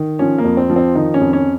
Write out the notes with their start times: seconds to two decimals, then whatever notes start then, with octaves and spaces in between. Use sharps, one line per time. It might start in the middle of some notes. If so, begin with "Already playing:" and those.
Already playing: D#3
0.19 F3 C#4
0.38 A#3
0.44 F2
0.57 C4
0.70 F3
0.76 C4
0.95 D#3 D#4
1.14 C#4
1.21 F2
1.33 C#4